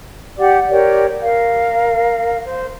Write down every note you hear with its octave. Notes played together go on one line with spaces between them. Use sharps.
G4 D5 F#5 D6
G4 A#4 C#5 D5
A#4 F5
C5